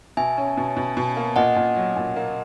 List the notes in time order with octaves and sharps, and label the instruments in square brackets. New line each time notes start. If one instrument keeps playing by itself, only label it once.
[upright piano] B2 [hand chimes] E5 G#5
[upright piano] C#4
B2
B2
B2
A#3
[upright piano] A#2 [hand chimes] D#5 F#5
[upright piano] A#2
F#3
A#2
A#3